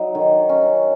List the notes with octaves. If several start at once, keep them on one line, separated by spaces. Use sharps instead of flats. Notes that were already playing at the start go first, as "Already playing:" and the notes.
Already playing: F#3 D#4
D#3
C#4